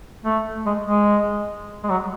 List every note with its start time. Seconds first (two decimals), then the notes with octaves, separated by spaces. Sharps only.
0.25 A3
0.66 G#3
0.86 G#3
1.84 G#3
1.90 F#3